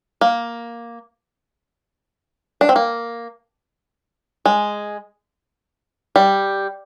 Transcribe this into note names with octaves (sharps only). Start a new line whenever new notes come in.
A#3
D4
C4
A#3
G#3
G3